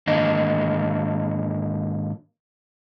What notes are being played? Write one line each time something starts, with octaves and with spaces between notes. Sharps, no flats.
G#2 D#3 A#3 D4 D#5